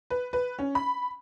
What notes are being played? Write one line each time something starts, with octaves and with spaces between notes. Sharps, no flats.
B4
B4
C#4
B5